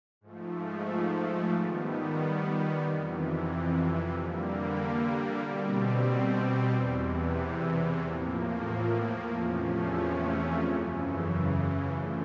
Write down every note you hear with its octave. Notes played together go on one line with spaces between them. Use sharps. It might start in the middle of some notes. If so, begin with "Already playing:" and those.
G#2 F3 A3
D#3 G3 B3
F2 C3 E3
D3 G3 A#3
B2 G3 C4
E2 C3 E3
A2 F3 A#3
E2 C3 F3 A3 C#4
F#2 C#3 E3
D3 F3 A3